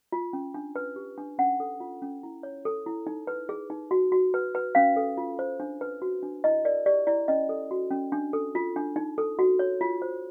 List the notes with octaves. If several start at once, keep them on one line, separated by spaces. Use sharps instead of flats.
F4
C#4
D4
B4
G4
D4
C#4 F#5
A4
F4
C#4
E4
C#5
A4
E4
D#4
B4
G#4
D#4
F#4
F#4
B4
B4
C#4 F5
A4
F4
C5
D4
B4
F#4
D4
E4 D#5
A#4 D5
G4 D5
E4 D5
C#4 D#5
A4
F#4
C#4
D4
A4
F4
D4
D#4
A4
F#4
C#5
F4
C5